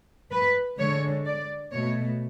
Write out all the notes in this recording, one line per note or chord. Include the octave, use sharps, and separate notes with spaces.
B4
D3 G#3 C#5
D5
B2 A3 C#5